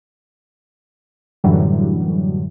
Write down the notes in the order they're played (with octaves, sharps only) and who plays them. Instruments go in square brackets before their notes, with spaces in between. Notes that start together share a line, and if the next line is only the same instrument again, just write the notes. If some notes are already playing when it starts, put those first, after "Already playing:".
[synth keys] F#2 A2 D3 E3 F#3 G3